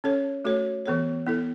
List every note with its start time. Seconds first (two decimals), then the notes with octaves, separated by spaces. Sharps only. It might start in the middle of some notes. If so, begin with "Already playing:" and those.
0.04 C#4 A4 C#5
0.45 A3 F#4 A4 C#5
0.86 E3 B3 A4 C#5
1.26 B3 E4 A4